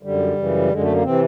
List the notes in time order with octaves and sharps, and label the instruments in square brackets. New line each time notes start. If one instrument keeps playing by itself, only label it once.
[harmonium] F#2 D3 G3
F#2 C#3 E3
F#2 D3 G#3
A3
A#3
C3 E3 C4